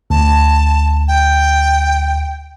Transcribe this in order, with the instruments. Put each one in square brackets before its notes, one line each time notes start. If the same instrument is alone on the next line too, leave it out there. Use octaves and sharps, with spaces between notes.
[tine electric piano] D2 [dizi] A5
[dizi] G5